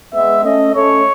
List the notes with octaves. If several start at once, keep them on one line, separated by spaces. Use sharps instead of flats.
G#3 B3 E5
A3 C#4 D#5
A3 C#4 C#5